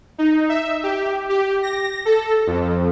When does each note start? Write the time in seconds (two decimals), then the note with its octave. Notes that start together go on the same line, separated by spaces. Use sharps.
0.18 D#4
0.49 E5
0.83 G4
1.29 G4
1.63 A#6
2.05 A4
2.47 F2